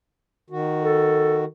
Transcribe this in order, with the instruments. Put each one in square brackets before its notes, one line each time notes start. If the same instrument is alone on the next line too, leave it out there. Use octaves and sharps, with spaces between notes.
[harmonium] D#3 F#4
[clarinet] A4